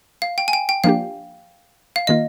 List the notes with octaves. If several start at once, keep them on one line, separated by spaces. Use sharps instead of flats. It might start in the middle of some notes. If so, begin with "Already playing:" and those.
F5
G5
G#5
G5
G5
F3 A#3 D4 G4 F5
F5
D#3 A#3 F4 D#5